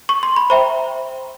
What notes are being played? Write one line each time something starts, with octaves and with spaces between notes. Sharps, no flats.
C#6
C6
B5
C5 E5 G5 A#5